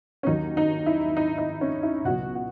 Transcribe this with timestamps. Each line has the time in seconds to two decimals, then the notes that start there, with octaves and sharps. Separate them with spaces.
0.23 C#4
0.26 D#2 D#3 F#3 D#4
0.57 D#4
0.86 E4
1.17 D#4
1.38 D#4
1.61 C#4
1.83 E4
2.05 C#2 B2 F#3 F#4
2.35 F#4